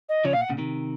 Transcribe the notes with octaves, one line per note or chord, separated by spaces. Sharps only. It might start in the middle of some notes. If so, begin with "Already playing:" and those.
D#5
C#3 F3 C#5
A#2 F5
F#5
A#2 C#3
C3 D#3